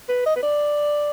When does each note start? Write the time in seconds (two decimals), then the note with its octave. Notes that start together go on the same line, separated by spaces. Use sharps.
0.09 B4
0.26 D#5
0.36 B4
0.42 D5